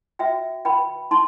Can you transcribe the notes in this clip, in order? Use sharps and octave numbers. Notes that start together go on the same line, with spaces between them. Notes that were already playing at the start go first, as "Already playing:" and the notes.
F#4 E5 G5
B4 G5 B5
D#4 A5 C6